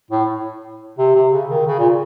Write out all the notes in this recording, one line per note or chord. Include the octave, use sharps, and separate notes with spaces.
A2
C3
C3
C#3
D#3
C#3
A#2